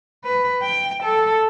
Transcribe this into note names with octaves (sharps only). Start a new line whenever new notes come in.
B4
G5
A4